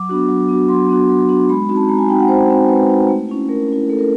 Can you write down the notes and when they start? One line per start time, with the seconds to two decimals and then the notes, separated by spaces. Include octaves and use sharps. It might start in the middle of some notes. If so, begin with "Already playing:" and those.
Already playing: F#3 D6
0.09 B3 D4 F#4
0.28 F#3
0.49 B3 D4 F#4
0.69 F#3 C6
0.89 B3 D4 F#4
1.09 F#3
1.29 B3 D4 F#4
1.49 G#3 B5
1.69 C4 D#4 F#4
1.76 A5
1.89 G#3 A#5
1.98 G#5
2.09 C4 D#4 F#4 G5
2.20 F#5
2.28 G#3 C5
2.49 C4 D#4 F#4
2.69 G#3 B4
2.89 C4 D#4 F#4
3.08 A3
3.29 C#4 E4
3.49 A3 A#4
3.68 C#4 E4
3.89 A3 A4
3.99 A#4